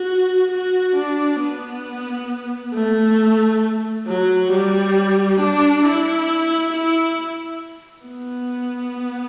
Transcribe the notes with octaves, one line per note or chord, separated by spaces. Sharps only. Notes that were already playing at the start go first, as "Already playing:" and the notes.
Already playing: F#4
F#4
D4
B3
A3
F#3
G3
D4
E4
E4
B3